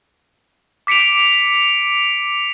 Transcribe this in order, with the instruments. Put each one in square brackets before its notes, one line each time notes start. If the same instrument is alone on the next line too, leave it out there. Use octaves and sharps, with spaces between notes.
[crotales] D6 B6 C#7 D7 F7